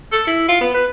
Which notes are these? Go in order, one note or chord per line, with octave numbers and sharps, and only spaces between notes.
A4
E4
F4
B3
B4